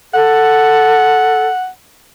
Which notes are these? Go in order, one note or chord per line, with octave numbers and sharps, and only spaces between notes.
A4 F#5